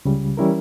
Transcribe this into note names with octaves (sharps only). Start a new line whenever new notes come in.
C#2 C#3 G3
E3 G3 C#4 E4 A#4